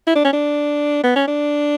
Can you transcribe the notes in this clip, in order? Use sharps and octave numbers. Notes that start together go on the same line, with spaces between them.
E4
D4
C#4
D4
B3
C#4
D4